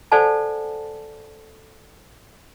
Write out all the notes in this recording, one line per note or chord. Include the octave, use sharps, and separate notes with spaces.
A4 C5 D5 F#5 G#5 A5